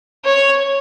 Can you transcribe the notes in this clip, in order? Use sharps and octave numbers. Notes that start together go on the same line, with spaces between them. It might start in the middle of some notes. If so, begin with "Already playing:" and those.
C#5